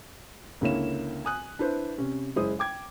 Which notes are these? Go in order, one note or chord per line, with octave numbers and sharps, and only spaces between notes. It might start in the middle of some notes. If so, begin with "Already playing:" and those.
C#2 D3 A#3 E4 C#5 E7
G#5 D#6 F#6
D4 E4 B4 C5
C3 C#4
F#1 G#3 E4 C5 D#6
G5 D6 G#6